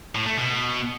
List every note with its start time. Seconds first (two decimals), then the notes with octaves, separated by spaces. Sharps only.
0.15 A2
0.26 A3
0.37 B2